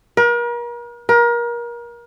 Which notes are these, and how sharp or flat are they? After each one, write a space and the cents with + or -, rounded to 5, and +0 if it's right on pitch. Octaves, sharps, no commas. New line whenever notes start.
A#4 +40
A#4 +30